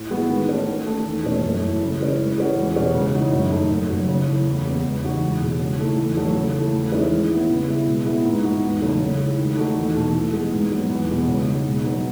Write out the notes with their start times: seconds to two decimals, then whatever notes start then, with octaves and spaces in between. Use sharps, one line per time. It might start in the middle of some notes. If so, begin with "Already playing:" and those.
Already playing: A2
0.10 E3 G#3 B3 F#4
0.29 D#3
0.49 A3 C#4
0.67 D#3
0.87 A3 C#4
1.05 E2
1.24 B2 A3 C#4
1.43 F#2
1.62 E3 A3
1.82 C#3
2.00 E3 G#3 C#4
2.19 E3
2.38 G#3 C#4 F#4
2.57 E2
2.76 B2 G#3 C#4 F#4
2.95 C#3
3.14 E3 G#3 D#4 F#4
3.33 F#2
3.51 D#3 A3 D#4
3.71 F#2
3.90 C#3 F#3
4.09 C#3
4.27 E3 A3
4.46 E2
4.65 C#3 G#3 B3
4.84 E2
5.04 C#3 G#3 D#4 F#4
5.22 E2
5.41 B2 G#3
5.59 C#3
5.79 E3 A3 D#4
5.97 E2
6.16 D#3 F#3 A3
6.35 C#3
6.55 E3 A3
6.74 E2
6.92 D#3 G#3 C#4 E4
7.11 E3
7.31 B3 E4
7.50 C#3
7.68 G#3 B3 E4
7.87 B2
8.05 G#3 B3 E4
8.25 G#2
8.44 E3 B3 D#4 F#4
8.62 E2
8.82 C#3 F#3 A3 D#4
9.00 C#3
9.20 E3 G#3
9.38 D#3
9.57 A3 D#4 F#4
9.77 E2
9.96 B2 A3 D#4
10.14 E3
10.33 G#3 B3
10.52 G#2
10.72 F#3 B3
10.90 E2
11.09 B2 G#3 B3
11.28 C#3
11.47 G#3 D#4 F#4
11.66 B2
11.84 F#3 B3 D#4